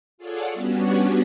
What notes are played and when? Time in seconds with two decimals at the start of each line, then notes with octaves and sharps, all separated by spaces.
0.18 F4 G#4 A4 C#5 D5 F#5
0.54 G3 B3 C#4 D4 F#4